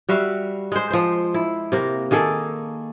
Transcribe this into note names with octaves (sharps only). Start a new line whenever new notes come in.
G3 F#4 E5 F5
G#3 C5
F3 C5
E4
C3 A#3
D#3 A#3 G#4 A4